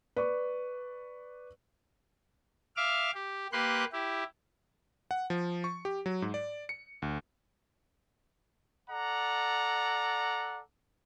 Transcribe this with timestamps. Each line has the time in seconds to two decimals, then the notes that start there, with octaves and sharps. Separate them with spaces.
0.16 B4 D5 C#6
2.76 E5 F5 D6 F6
3.14 G4
3.53 A#3 G4 B4 C6 F#6
3.93 E4 G4
5.11 F#5
5.30 F3
5.64 C#6
5.85 G4
6.06 F#3
6.22 G#2
6.34 D5
6.69 C#7
7.02 D2
8.90 A4 D5 F#5 A#5